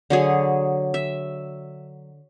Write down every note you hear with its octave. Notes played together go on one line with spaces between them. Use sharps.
D3 F#3 G#4
E5